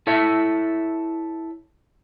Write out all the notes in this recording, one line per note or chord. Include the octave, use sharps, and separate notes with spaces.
E4 A4 C#5 E5